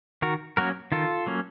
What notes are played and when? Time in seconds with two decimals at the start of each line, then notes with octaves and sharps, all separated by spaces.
0.22 D#3 F#4 A#4
0.57 F#3 A#3 C#4 F#4 A#4
0.92 D#3 F4 A4
1.27 F#3 A#3 C#4